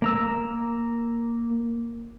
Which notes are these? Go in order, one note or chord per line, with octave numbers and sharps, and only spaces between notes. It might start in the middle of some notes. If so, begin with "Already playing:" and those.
A#3 A#5 E6